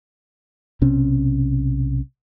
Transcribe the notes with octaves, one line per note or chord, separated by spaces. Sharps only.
B1 C3 C#4